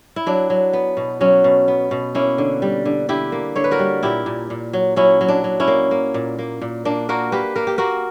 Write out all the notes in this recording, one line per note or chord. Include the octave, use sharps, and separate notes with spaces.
E4
F#3 D4
F#3
B3
B2
F#3 C#4
B2
B3
B2
A#3 C#4 E4
D3
G3
D3
D3 E4 G4
A#3
D3 C#5
B4
F#4 A#4
G3
A#2 E4 G4
A#2
A#2
F#3
F#3 C#4 E4
F#3
D4
F#3
C#4 E4
A#3
A#3
A#2
A#3
A#2
A#3 D4
A#3 F#4 A#4
A#3 G4 B4
A#3 A#4
G4
A#3 F#4 A#4